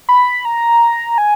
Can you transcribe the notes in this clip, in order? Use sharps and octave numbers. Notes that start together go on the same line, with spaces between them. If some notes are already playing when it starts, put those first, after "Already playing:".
B5
A#5
G#5